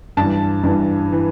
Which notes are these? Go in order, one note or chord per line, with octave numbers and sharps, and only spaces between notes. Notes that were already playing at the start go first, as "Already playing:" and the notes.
G2 E3 A5
G2 E3
E3